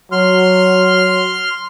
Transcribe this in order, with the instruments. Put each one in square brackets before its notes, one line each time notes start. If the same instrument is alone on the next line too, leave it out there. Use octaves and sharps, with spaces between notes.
[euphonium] F#3 [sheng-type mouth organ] C6 F6